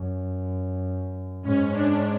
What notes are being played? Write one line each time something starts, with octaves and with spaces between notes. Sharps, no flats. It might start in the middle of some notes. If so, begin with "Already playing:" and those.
Already playing: F#2
G#2 C#4
D4